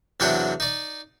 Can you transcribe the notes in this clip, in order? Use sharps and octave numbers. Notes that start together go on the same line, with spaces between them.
E2 C3 F#3 D4 F#5 G5
D#4 D5